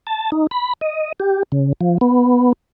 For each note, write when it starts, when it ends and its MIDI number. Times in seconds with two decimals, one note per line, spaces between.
0.07 0.30 81
0.32 0.47 63
0.51 0.73 83
0.81 1.12 75
1.20 1.43 67
1.52 1.73 49
1.81 1.98 53
2.01 2.53 59